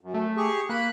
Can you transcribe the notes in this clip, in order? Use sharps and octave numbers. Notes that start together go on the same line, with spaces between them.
F#2
A3
G4 G#4 C#6
A#3 B5 F#6